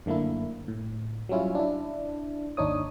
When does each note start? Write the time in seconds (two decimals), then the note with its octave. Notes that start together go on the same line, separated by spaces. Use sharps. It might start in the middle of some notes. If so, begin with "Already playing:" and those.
0.06 F#2 D3 A3 A#3 E4
0.68 A2
1.29 F#3 G3 C#4 E4 F4
1.55 D4 E4
2.57 G#1 D#2 D4 D#4 C#5 D#6